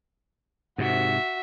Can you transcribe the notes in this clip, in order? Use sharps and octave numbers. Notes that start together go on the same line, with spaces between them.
G#2 C3 F#4 E5